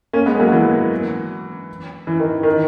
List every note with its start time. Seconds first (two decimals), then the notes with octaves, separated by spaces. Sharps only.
0.13 A#3 C#4
0.26 G#3 B3
0.39 F#3 A#3
0.52 E3
2.07 E3
2.20 D#3
2.43 D#3